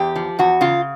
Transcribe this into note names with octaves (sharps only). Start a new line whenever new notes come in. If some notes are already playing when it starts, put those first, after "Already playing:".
Already playing: E2 G4
F3
E2 F#4
C#3 F4